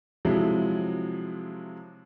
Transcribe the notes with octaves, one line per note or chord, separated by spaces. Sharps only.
C3 F3 F#3 G#3 E4